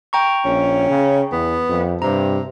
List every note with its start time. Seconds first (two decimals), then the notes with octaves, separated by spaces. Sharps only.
0.13 G5 A#5 C#6
0.45 A#1 C#4
0.90 C#3
1.32 E2 B3
1.69 F2
2.02 G2 C3 A#5